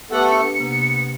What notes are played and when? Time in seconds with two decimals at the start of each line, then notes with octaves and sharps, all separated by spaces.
0.11 A3 B3 G4 A4 B4 F#5 D6
0.31 D4 C#7
0.58 C3 A#3 B3